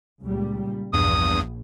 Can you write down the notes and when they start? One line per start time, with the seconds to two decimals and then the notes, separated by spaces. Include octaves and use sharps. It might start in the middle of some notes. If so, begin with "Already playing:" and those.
0.22 C#2 A#2 G3
0.93 A#1 E2 G2 D#6